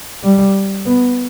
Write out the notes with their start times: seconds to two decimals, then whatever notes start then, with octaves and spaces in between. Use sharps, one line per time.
0.23 G3
0.85 B3